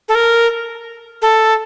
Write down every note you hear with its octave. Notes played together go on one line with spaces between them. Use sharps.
A4
A#4
A4